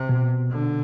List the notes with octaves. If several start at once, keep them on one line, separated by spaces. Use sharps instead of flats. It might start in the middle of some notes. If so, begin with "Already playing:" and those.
Already playing: C3
B2
D3